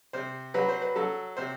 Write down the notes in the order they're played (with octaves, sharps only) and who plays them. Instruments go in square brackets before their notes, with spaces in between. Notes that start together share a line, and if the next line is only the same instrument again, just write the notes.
[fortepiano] C3 C5
F#3 B4
C5
B4
F#3 A4
C3 C5